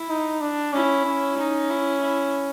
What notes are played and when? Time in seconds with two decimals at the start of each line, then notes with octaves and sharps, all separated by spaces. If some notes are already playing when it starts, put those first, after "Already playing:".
Already playing: E4
0.09 D#4
0.41 D4
0.73 C#4 E4
1.05 C#4
1.38 D#4
1.70 E4
2.01 E4